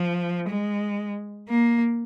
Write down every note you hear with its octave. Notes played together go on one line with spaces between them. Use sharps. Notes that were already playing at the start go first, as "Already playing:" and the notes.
Already playing: F3
G#3
A#3